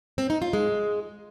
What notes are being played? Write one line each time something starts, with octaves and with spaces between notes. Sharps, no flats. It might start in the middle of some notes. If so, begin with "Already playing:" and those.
C4
D#4
F4
G#3